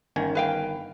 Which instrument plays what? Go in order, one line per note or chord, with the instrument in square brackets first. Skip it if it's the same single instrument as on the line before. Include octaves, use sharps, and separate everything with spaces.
[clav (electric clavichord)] G1 D#3 G#5 [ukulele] C#4
[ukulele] B4 F5 G5